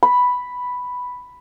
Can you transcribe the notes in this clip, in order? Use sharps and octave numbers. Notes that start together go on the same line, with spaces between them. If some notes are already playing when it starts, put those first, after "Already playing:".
B5